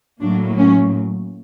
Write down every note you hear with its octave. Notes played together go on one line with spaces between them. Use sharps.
A2 F#3 A#3 D4
C#4